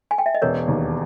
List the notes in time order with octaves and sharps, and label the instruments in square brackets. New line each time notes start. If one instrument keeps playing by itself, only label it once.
[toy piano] G#5
G5
E5
D#5
[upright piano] E1 [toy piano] A#4 C#5
[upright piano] D#2